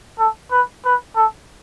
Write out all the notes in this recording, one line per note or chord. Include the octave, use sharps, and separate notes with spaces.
A4
B4
B4
A4